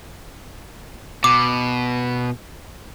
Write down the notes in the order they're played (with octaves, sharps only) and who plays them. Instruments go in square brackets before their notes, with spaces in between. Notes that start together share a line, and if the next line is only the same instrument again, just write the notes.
[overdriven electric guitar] B2 [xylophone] D6